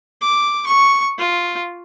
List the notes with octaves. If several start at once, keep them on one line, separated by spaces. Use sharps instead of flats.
D6
C#6
F4